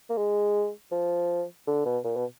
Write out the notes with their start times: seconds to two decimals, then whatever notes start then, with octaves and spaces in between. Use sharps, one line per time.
0.10 A#3
0.17 G#3
0.91 F3
1.67 D3
1.85 B2
2.04 A#2
2.16 B2